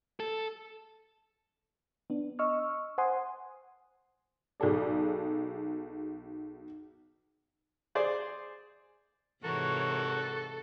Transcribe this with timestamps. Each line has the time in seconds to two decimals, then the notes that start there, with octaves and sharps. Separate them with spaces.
0.20 A4
2.10 B3 D4
2.39 D#5 C#6 E6 F6
2.98 C5 F#5 G#5 C6 D#6
4.60 B1 G#4 A4 D5
7.95 G#4 C5 D5
9.44 G#2 C3 E3 F#4 A4 A#4 C#5